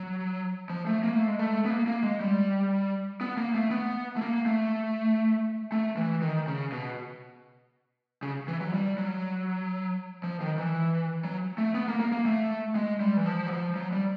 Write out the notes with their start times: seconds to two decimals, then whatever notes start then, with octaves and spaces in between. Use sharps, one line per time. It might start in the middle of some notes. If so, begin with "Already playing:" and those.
Already playing: F#3
0.70 F3
0.87 A3
1.03 A#3
1.15 A3
1.28 G#3
1.39 A3
1.65 B3
1.70 A#3
1.87 A#3
2.03 G#3
2.20 G3
3.21 B3
3.37 A#3
3.55 A3
3.71 B3
4.16 A3
4.22 A#3
4.46 A3
5.72 A3
5.97 E3
6.22 D#3
6.47 C#3
6.72 B2
8.23 C#3
8.48 E3
8.61 F#3
8.73 G3
8.98 F#3
10.24 F3
10.41 D#3
10.58 E3
11.24 F#3
11.58 A3
11.75 B3
11.88 A#3
12.00 A#3
12.12 A#3
12.25 A3
12.75 G#3
13.01 G3
13.17 E3
13.26 F3
13.46 F#3
13.50 F3
13.76 F#3
13.92 G3